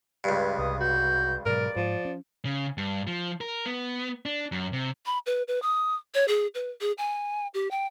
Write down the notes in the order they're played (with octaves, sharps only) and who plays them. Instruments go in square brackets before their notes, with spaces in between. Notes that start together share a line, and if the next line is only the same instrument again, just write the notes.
[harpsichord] C#2 G2
[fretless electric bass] C2 [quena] D#6
[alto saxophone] F#4 [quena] G6
[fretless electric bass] G#2 B2 F#3 [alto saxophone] A#4 [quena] D5
[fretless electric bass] G#2 [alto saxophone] F3
[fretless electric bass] C#4
[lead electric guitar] C#3
G2
F3
A#4
B3
D4
F#2
C3
[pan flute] B5
B4
B4
D#6
C#5
G#4
B4
G#4
G#5
G4
G5